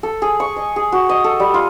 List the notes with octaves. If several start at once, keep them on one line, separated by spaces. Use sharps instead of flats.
A4
G#4
C#6
D#5
G#4
F#4
D#5
A4
G3
F4